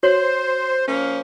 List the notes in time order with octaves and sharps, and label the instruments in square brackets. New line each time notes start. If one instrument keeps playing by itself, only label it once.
[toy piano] F#4 C#5 C6 [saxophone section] C5
[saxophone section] F3 A#3 C#4